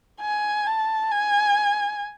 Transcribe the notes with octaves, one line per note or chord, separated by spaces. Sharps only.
G#5
A5
G#5